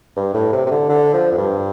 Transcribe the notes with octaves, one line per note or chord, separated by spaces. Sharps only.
G2
A2
C3
C3
D3
D3
F3
F2
G2